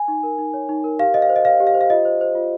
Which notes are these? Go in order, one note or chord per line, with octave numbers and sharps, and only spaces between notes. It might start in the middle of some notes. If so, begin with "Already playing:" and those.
Already playing: G#5
D#4
A#4
D#4
C#5
D#4
A#4
G4 F5
C5 D#5
F5
C5
D#5
G4 F5
G4
F5
C5
F5
F4 D#5
C5
C5
F4